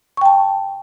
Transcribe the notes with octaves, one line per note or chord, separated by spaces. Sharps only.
G5 A5 C#6